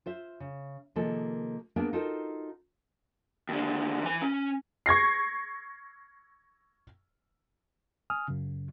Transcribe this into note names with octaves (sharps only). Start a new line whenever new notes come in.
F4 C5 E5
C#3
C3 D#3 F3 G#3 A#3 A4
A#3 B3 D4 G#4 A#4
D#4 F4 F#4 A4 A#4 C5
D#2 D3
E3 G#5
C#4
C#6 G#6 A#6 C7
G#5 D#6 F6
F#2 C#3